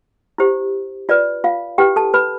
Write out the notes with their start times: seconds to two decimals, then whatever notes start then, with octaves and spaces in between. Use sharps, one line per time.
0.38 E4 G4 C5
1.09 F4 B4 D5
1.44 F4 F5
1.78 E4 G4 B4 G5
1.96 A4 A5
2.14 B4 B5